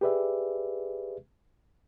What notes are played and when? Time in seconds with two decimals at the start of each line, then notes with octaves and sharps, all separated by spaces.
0.01 G4 G#4 B4 D5 E5